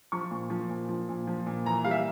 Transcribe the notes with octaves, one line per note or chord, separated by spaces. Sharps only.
F3 C#6
A#2
F3
A#2
F3
A#2
F3
A#2
E3 A#5
G3 F5
E5